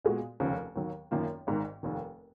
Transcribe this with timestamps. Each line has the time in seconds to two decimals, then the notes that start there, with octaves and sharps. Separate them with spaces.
0.05 A#2 G#3 B3 F#4
0.40 F1 D#2 C#3 F3
0.76 D#2 D#3 F#3
1.11 G#1 F#2 D#3 A#3 F4
1.47 G#1 G#2 D#3
1.83 F1 D#2 D#3